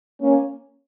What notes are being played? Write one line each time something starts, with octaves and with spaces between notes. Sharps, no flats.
A#3 C#4